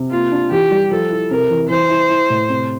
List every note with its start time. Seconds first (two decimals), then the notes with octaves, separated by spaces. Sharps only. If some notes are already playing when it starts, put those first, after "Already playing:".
Already playing: C3
0.11 A#3 F4
0.32 D4
0.51 E3 G4
0.71 G3
0.91 F3 A4
1.10 E4
1.31 C3 A#4
1.50 E3
1.70 E3 C5
1.90 E4
2.09 E4
2.30 A2
2.49 C3